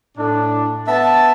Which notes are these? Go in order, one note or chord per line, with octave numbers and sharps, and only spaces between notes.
A2 D4
B3 E5 A5